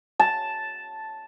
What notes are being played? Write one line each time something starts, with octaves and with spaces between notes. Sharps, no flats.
A5